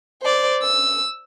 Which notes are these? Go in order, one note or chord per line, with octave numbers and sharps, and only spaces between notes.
C5 D5
E6